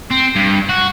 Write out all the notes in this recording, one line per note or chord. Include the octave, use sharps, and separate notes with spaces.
C4
G2
F#4